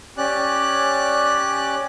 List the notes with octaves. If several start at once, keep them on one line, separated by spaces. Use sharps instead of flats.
C#4 G4 D5 F#6